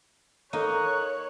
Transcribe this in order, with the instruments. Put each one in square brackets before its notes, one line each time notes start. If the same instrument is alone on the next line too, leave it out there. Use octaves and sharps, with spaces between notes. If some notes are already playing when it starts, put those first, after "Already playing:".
[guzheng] A#3 D#4 [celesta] A4 D#7 [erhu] C#5 [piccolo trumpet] F#6